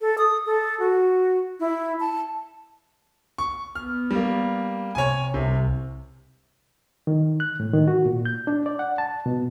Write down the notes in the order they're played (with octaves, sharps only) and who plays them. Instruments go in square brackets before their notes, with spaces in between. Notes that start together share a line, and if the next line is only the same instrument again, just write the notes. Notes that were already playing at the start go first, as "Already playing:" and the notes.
[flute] A4
D#6
A4
F#4
E4
A5
[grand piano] C#6
[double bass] B3 [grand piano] F6
[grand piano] G3 A#3
[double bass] C3 [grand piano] C#5 G#5
[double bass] C2 [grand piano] C3
[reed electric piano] D#3
F#6
A2
D#3
F#4
A#2
G6
D4
D5
F#5
A5
B2